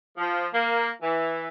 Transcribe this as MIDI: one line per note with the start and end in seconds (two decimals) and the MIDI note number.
0.17 0.46 53
0.53 0.88 58
1.02 1.48 52